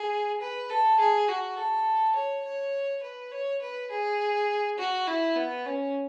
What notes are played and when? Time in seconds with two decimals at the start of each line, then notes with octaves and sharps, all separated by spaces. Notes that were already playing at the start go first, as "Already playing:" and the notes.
Already playing: G#4
0.41 B4
0.70 A4
0.99 G#4
1.28 F#4
1.57 A4
2.15 C#5
2.45 C#5
3.03 B4
3.32 C#5
3.61 B4
3.90 G#4
4.78 F#4
5.07 E4
5.36 B3
5.65 C#4